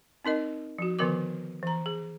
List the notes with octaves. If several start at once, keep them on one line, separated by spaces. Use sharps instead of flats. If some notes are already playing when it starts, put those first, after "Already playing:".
C4 D#4 A#4 D#5
F3 F#4
D3 D#3 F3 B3 A#4 D6
E3 A#5
G#4